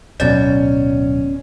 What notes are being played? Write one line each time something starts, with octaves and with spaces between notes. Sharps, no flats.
D1 B2 F#3 C#4 D5 A6